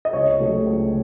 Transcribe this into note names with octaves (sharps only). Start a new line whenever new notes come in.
D#5
C#2 C#5
C3 F#3 A3
C#2